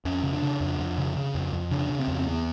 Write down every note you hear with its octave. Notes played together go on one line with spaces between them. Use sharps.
F2 C#4
C#3
D4
C#3
F2
F2
C#3
C#3
F2
F2
C#3 D4
C#3
C4
F2
C4
E2 B3